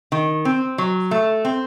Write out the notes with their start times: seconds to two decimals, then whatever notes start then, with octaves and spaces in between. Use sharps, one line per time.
0.12 D#3
0.45 C4
0.78 F#3
1.11 A3
1.45 C4